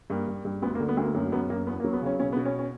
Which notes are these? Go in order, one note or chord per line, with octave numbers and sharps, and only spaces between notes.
G2 A#3
G2
G2
D2 B3
A#3
D3
B3
D2 A#3
F#2 A#3
F#2 B3
F#2 A#3
E2 B3
A#3
F#3
B3
C#3 C#4
B2 C#4
B3
B2
C#4
C#4